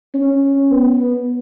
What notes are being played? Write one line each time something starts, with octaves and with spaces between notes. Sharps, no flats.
C#4
B3